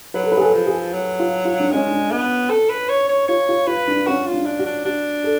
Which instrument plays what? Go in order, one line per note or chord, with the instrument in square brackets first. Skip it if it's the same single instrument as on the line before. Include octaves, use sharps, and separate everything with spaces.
[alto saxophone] F#3 [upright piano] B4
[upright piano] A4
B4
G#4
A4
[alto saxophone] F3
[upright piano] G#4
[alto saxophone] F#3
[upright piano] F4
F4
D4
[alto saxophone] G#3 [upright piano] C#4
[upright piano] D4
[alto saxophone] B3
A4
B4
C#5
C#5
[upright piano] F4 [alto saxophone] C#5
[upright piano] F4
[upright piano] F4 [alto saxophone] B4
[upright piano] D4
[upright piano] C#4 [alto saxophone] F#4
[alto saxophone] F4
[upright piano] D4
[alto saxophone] D4
[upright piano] F#4
[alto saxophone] D4
[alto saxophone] D4 [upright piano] F#4
[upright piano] A4